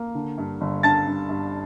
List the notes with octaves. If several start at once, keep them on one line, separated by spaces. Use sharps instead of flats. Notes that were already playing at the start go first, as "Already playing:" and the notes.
Already playing: A#3
D3
G2
G1
G2 A5 A6
G2
G2